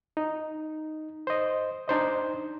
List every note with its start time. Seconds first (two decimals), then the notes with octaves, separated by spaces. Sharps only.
0.17 D#4
1.27 C5 D#5
1.88 D4 D#4 C5 D#5